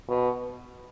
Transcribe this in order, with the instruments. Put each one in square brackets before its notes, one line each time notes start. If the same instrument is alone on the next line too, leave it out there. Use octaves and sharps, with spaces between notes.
[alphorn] B2